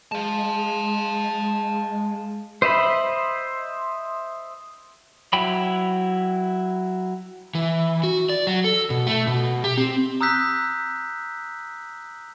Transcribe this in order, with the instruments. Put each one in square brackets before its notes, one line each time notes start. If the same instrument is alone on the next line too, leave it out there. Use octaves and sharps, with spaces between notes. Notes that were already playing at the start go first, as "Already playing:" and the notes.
[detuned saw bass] G#3 [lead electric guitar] F5 A5
[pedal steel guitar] C5 D#5 E5 B5
F#3 E4 G5 B5
[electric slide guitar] E3
F#4
D5
F#3
A4
B2
A3
B2
G4
C4
[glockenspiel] A#5 D#6 E6 F#6 G6 B6